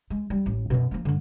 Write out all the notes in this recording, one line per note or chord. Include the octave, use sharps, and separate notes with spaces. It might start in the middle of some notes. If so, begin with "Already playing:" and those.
G#3
G3
A1
F#2 B2
F3 A#3
G2 D3